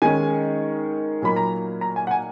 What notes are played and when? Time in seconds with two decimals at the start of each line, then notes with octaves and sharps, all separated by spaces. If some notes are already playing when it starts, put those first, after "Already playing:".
0.02 D#3 G#3 C#4 G#5
1.22 A#2 F#3 A#3 D#4 B5
1.36 A#5
1.81 A#5
1.96 G#5
2.07 F#5
2.11 G#5